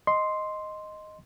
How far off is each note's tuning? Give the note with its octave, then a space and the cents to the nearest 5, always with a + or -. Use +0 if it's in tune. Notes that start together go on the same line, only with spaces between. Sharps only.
D#5 +0 C6 +0